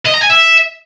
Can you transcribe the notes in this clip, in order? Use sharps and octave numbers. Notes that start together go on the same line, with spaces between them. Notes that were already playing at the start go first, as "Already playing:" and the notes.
D#5
A#5
G#5
E5